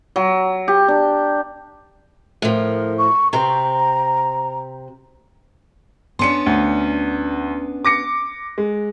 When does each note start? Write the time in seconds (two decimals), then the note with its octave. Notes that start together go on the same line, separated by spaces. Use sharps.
0.16 F#3
0.68 G4
0.88 D4
2.42 A2 F3 A#4
2.98 C#6
3.33 C3 C4 A#5
6.19 B3 C#4 D4 C6 C#7
6.46 D2
7.85 D6 A#6 C#7
8.58 G#3